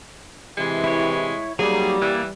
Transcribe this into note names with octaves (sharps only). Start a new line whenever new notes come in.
C3 E3 G#3
E4 C#5
F#3 G3 A#3 D#4 G#4
E3 A#3 D5